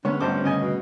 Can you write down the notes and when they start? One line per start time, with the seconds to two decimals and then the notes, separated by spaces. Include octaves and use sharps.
0.05 D3 G#3 B3 C#4 C#5
0.20 G#1 D2 G2 B3 C5 D6
0.44 C#3 D#5 G#5
0.61 B2